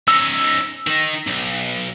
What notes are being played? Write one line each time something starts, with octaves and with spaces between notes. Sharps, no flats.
C#4 D#4 E6
D#3 D#4
B1